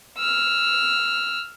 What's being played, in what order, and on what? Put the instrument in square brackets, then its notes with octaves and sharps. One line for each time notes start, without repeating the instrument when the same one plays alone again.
[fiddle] E6 F6